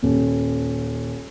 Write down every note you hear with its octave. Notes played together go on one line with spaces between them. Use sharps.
D#1